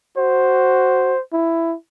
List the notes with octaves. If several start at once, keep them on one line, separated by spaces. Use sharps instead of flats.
F#4 C5
E4